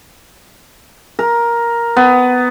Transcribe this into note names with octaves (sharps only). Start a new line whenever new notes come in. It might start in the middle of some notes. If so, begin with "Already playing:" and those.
A#4
B3